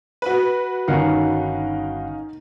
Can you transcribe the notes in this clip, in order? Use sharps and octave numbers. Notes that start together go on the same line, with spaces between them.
F#4 B4
G1 D#3 C#4 D#4 A#4 F5 F#5